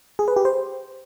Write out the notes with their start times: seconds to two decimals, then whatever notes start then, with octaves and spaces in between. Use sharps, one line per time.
0.19 G#4
0.28 B4
0.36 G4
0.45 C5